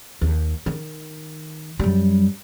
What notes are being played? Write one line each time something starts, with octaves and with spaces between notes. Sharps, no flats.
D#2
D#3
F#2 G3